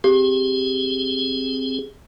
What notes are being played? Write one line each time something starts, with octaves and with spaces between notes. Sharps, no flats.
C4 G4 G#4